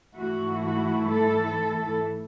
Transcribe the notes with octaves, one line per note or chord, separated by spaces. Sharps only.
G#2 E3 A3 E4 F#4
F#4
A4